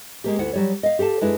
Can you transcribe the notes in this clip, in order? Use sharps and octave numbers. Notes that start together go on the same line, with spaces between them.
G#3 A#3 G4
D2 E4 F#5
F#3 G3 C#5
D#5 F5
G4 A4 F5 A5
F#2 G#3 D4 E4 B4